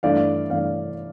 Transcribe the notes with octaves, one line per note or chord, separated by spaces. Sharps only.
G2 E3 A3 D5 F5
G2 E3 A3 D5 F5